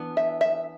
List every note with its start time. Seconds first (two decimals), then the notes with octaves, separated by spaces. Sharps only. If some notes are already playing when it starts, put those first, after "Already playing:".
Already playing: E3 B3 D4
0.17 E5
0.41 E5